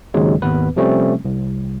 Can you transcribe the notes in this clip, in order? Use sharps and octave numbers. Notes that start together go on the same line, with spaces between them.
G#1 D#2 G#2 C#3 F#3 G#3
G#1 D#2 B3 B4
C3 F3 G3 A3 C4 C#4
C2